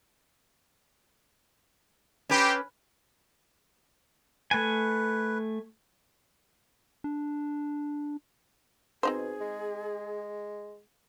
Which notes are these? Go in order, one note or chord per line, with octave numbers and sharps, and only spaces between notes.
C4 C#4 G4 B4
A3 B4 G#5
D4
B2 C4 D#4 G#4 C5
G#3